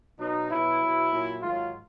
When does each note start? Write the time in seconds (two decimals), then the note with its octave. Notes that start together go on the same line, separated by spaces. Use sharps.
0.19 B2 F#3 D#4
0.50 B2 F#3 E4
0.81 B2 F#3
1.11 A#2 F#3
1.42 G#2 D#3 F#3 F4